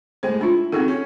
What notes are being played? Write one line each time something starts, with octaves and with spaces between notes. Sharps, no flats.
A2 G#3 C5 G5
D4 E4 F4
D#3 C4 D#4 F#4 G#4 A4
C#4